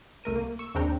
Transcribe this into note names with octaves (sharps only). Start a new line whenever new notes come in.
C2 A3 A#4 D#7
A#3
C#6 E6
D#2 C#3 C4 D4 G5 A#5